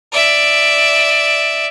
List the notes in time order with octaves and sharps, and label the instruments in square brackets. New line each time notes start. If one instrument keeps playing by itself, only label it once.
[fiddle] D5 E5